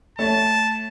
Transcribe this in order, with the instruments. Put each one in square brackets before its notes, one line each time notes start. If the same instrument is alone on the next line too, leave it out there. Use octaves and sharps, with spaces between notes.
[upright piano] A3 C#5 [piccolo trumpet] A5